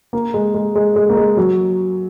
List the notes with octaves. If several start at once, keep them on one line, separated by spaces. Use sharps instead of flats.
A#3
G#3
G#3
G#3
G#3
A#3
G#3
F#3